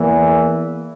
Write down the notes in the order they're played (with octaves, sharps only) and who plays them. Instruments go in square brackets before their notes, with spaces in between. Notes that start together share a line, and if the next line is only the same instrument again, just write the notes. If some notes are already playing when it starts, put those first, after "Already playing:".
Already playing: [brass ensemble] E2 E3 A#3